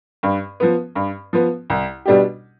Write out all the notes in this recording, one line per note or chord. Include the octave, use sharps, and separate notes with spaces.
G2
F3 B3
G2
F3 B3
C2
B2 G3 D4 G4